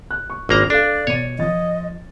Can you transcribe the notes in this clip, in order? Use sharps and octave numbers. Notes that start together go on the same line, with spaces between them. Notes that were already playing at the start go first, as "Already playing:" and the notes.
F#6
C#6
G#1 A#3 D4 F4 A#5
D4 A4 D5 F5
B2 C#5 D#7
F3 D#5 A6